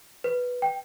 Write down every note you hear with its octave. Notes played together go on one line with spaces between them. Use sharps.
B4
G5